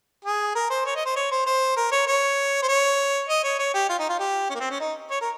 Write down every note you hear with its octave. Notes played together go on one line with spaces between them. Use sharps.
G#4
A#4
C5
C#5
D#5
C5
C#5
C5
C5
A#4
C#5
C#5
C5
C#5
D#5
C#5
C#5
G4
F4
D#4
F4
G4
C#4
A#3
C4
C#4
D#4
C#5
A#4